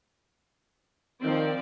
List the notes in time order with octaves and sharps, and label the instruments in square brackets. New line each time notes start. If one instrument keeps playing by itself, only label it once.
[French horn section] D#3 [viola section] F3 C4 D5